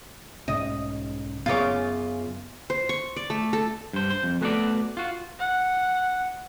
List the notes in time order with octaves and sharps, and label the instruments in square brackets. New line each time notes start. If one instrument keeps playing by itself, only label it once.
[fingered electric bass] B1 G#2 C#3 [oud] D#5
[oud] F#2 C#3 C#5 [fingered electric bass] B3 [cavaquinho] F4 D6
[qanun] C5
C#6
D5
A3
A4
[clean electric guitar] G2 C5
C5
F2
A3 B3 F#4 G#4 A4 D5
F4 F#4
[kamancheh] F#5